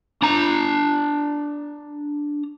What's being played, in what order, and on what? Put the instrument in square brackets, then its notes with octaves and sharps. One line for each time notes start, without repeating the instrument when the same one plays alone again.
[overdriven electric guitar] D4 A#5